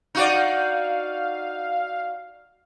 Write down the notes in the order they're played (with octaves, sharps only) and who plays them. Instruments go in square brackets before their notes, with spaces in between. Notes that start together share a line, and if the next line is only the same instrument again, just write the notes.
[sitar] D#4 F#4 D5 [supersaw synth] F5